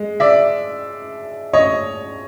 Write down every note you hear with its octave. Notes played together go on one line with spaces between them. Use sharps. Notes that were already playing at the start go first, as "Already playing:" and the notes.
Already playing: G#3
D5 E5
C#5 D#5